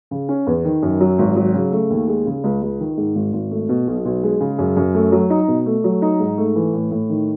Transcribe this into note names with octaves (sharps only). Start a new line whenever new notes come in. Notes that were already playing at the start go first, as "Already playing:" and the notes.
C#3
C#4
E2
D#3
F#2
F#3
G#1
F#3
C#3
A3
D#2
G#3
C#3
C#2
C#2
D#3
G#2
G#1
G#1
A3
B2
B1
B1
G#3
C#3
F#2
F#2
A3
F#3
D#4
B2
A3
F#3
D#4
G#2
A3
E3
A2
A2
D#3